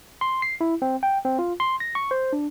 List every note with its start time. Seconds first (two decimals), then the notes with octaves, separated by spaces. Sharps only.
0.21 C6
0.42 C7
0.61 E4
0.82 C4
1.03 G5
1.25 C4
1.39 F4
1.60 C6
1.80 A#6
1.95 C#6
2.11 C5
2.33 D4